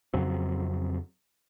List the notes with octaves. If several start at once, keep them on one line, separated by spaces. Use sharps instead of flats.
F2 C#3 F#3 C4